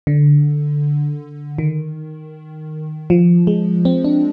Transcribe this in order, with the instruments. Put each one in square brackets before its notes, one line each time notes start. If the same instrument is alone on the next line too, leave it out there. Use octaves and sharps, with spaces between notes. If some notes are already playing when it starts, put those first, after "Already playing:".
[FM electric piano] D3
D#3
F3
G#3
C4
D4